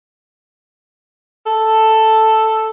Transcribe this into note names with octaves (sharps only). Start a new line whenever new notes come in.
A4